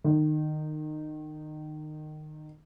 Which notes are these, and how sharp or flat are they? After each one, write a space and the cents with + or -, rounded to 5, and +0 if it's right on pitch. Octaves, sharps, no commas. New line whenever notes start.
D#3 -25